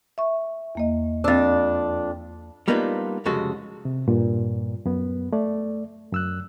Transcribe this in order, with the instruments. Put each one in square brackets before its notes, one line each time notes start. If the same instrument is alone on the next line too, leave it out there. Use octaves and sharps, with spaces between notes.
[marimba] E5 C#6
E2 A#3 D#5
[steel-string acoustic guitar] F2 D4 [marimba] E6 A6
[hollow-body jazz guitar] G3 A#3 B3 D4 D#4 F4
C2 F2 C#3 G#3 F#4 A4
[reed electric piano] C3
G2 A#2
F#2 B3
A3 D5
F#2 E6 F#6